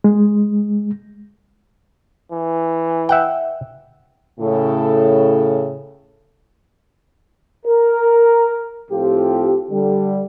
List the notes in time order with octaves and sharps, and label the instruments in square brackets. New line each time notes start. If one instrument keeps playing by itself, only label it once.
[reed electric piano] G#3
[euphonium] E3
[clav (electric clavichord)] E5 F#5 G5
[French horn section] A2 C#3 A4
[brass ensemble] A#4
A2 F3 C4 F4 G4
D3 G3